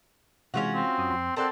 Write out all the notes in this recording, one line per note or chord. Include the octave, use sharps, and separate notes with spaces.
C3 E3 G#3 C#4 F4 F#4
C4
F#2 D#6
F2 C6
C4 A4 A#4 D5 F#5 A5